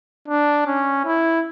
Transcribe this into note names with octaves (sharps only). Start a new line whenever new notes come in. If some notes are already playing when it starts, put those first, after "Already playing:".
D4
C#4
E4